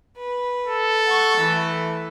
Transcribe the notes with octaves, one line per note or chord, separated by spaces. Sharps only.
B4
A4
F#5 C#6
E3 A3